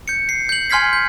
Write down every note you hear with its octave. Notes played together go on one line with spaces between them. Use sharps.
G6 C#7
C7
G6 F#7
G#5 C6 F6 G#6 B6 C7
G6